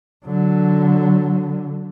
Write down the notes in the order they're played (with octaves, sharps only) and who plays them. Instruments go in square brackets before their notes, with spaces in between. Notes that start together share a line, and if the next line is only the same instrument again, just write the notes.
[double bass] D3 F#3